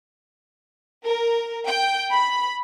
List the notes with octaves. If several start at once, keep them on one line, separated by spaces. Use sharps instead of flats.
A#4
G5
B5